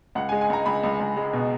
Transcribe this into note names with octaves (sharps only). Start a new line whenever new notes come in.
C#2 F#5
G#3 G#5
G#5
C#2 A#5
C#2 B5
C#2
C#2
G#3
B2